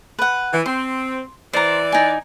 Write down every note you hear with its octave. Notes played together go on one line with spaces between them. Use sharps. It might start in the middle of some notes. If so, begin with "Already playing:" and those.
B4 F#5
E3
C4 C6
E3 C5 D5 A#5
D#4 G#5